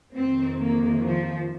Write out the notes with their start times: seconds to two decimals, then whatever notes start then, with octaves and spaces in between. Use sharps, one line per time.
0.16 F2 C3 D#3 C4
0.60 A#3
1.03 F3